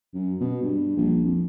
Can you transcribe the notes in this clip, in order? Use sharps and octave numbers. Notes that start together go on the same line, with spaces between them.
F#2
B2
G2
A#1
F2